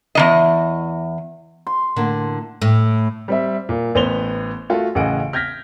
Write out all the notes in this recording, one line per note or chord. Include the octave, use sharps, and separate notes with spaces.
E2 D#3 D#5
C6
A2 D3 A#3
A2
G3 C4 E5
A#2
A1 B3 C5 F7 G7
A3 F4 F#4
A1 C#3 G#4 D#5 F#5 D7
F6 G6 G#6 A#6 B6